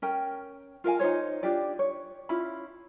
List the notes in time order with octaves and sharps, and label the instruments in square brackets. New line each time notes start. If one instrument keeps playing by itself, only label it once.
[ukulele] C#4 A#4 G5
F4 A#4 F5 G#5
D#4 F4 C5 C#5
D4 F4 G4 D5
C#5
C#4 E4 F4 B5